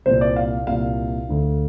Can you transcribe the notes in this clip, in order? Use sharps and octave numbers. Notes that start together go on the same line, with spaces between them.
C2 A#2 C5
D5
F5
C2 A#2 F5
D2 D3